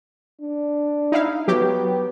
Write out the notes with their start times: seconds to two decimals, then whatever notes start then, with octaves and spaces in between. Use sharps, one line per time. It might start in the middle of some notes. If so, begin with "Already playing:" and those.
0.41 D4
1.12 D#4 E4 F5
1.48 F#3 B3 G4